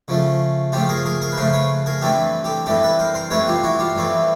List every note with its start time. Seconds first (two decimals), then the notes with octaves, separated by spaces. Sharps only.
0.08 C#3 F3 A3
0.72 C#3 F3 A3 F4 G4
0.89 G#4 A#4
1.06 G#4 A#4
1.22 G#4 A#4
1.32 B4
1.37 C#3 F3 A3 A#4 C5
1.53 B4 C#5
1.86 G#4 A#4
2.01 G2 E3 A3 C4 G4 A4
2.44 G4 A4
2.66 G2 E3 A3 C4 G4 A4
2.83 A4 B4
2.99 A#4 C5
3.14 A#4 C5
3.30 G2 E3 A3 C4 B4 C#5
3.48 F4 G4
3.63 E4 F#4
3.79 F4 G4
3.96 G2 E3 A3 C4